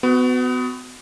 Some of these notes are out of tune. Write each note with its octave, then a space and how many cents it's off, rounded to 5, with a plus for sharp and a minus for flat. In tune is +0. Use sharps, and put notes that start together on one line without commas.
B3 +30 F#4 +0